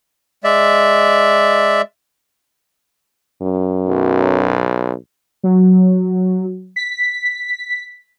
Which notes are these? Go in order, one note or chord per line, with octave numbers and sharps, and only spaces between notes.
G#3 D5 E5
F#2
B1
F#3
B6